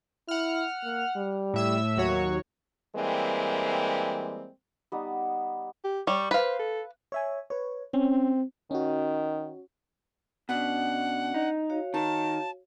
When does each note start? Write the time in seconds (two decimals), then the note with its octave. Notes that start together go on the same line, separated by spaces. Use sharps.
0.28 E4 F#5 F6
0.83 A#3
1.16 G3
1.54 A2 E5 E6
1.97 D#2 F#3 F#4 C#5
2.96 E3 G3 G#3 A#3 C4
4.92 G3 B3 D#4
5.84 G4
6.07 G3 C#6
6.31 B4 C5 F5
6.59 A4
7.12 C#5 E5 G#5
7.50 B4 C#5
7.94 C4 C#4
8.71 D#3 C#4 F#4
10.49 B2 C#4 D4 D5 F#5
11.34 D#4
11.70 F#4 C#5 F5
11.94 D#3 A5